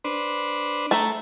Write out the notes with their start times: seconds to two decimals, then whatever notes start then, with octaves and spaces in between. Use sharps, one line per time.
0.04 D4 B4 C5
0.91 A3 A4 A#5